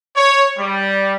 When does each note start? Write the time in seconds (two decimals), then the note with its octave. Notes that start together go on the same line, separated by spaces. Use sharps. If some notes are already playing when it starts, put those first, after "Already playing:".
0.16 C#5
0.58 G3